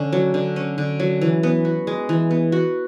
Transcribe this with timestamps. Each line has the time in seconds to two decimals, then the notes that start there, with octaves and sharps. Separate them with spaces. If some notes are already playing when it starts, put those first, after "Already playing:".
Already playing: D3 C#4
0.13 F#3
0.34 D3
0.56 C#4
0.78 D3
1.00 F#3
1.21 E3
1.43 B3
1.65 F#4
1.87 G#3
2.09 E3
2.31 B3
2.52 F#4